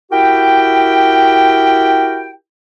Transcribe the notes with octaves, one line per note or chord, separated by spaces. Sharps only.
E4 F#4 G4 A#4 G5